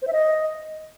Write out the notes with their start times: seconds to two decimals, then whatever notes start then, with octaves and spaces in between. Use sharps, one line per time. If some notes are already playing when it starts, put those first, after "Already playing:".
0.02 C5
0.07 E5
0.13 D#5